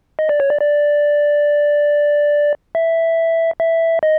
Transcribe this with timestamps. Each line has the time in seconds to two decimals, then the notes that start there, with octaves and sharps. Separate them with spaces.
0.19 D#5
0.29 D5
0.40 C#5
0.50 D5
0.61 D5
2.75 E5
3.60 E5
4.03 D#5